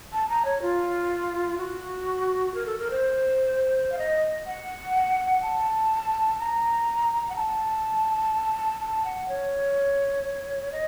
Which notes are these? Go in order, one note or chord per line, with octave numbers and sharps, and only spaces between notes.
A5
A#5
C#5
F4
F#4
A#4
A4
A#4
C5
F5
D#5
F#5
A5
A#5
F#5
A5
A5
F#5
C#5
D#5